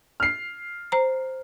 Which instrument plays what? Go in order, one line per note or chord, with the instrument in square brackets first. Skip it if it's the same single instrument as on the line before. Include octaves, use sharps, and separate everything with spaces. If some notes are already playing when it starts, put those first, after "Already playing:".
[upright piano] F6 C7
[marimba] C5 A#5